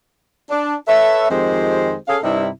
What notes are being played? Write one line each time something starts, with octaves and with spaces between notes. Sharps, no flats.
D4
A4 B4 C#5 E5
F2 D#3 G#3 C4 G4 C5
C#4 G#4 A4 F5
G2 C3 G3 D#4 E4